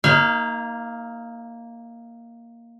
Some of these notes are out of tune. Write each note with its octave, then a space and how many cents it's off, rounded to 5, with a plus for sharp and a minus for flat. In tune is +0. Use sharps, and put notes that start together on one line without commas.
A#3 +0 D#4 +30 F5 -35